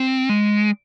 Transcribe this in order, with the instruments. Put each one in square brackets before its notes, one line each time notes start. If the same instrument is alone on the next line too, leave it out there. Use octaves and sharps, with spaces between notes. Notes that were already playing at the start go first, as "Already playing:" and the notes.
Already playing: [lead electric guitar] C4
G#3